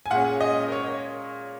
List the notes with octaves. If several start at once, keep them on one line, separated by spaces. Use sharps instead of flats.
G#5
A#2 G#3 C#4 F#5
D#5
A#4
C#5